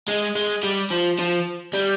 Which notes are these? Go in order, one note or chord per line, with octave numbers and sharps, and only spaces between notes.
G#3
G#3
G3
F3
F3
G3